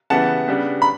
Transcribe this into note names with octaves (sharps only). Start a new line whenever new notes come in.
C#3 E3 G3 B3 F#5 A5
C#3 G3 B3 D4
B5